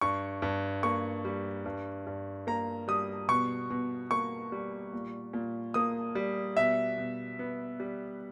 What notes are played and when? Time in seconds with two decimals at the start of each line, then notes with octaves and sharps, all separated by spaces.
0.01 G2 C#6
0.42 G2
0.83 A#3 C#6
1.25 G3
1.66 G2
2.07 G2
2.47 A#3 A#5
2.88 G3 D#6
3.29 B2 C#6
3.70 B2
4.11 A#3 C#6
4.52 G3
4.93 A#2
5.33 A#2
5.74 A#3 D#6
6.15 G3
6.57 B2 E5
6.98 B2
7.39 B3
7.80 G3